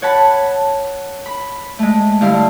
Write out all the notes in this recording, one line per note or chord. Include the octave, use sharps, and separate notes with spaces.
C#5 F#5 A5 B5
B5
G#3 A3
G2 D3 E4 F5